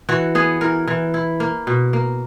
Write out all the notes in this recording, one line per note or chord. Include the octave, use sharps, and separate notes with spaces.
E3 F#4
B3 G#4
E3 A#4
E3
E4
A#3
B2
A#3